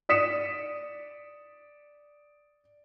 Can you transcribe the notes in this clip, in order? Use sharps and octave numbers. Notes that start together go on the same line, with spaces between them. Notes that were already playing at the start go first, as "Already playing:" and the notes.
D5 D#6 B6 C#7 E7